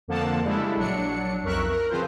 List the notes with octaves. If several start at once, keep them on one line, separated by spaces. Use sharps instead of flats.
F2 D3 F3 A#3 F#5 A5
C#3 G3 G#3 D4 E4 A4
A#1 F#3 D4 C#7
B1 F2 A#4 E5 C#6 F#6
A#4
C#3 F3 C4 F4 B4 C5